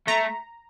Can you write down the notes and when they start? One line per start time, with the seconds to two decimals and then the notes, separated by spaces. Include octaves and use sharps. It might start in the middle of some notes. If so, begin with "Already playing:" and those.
0.08 A3 A#5